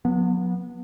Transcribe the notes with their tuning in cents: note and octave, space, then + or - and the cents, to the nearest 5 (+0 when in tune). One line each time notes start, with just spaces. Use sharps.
F#3 -35 B3 -20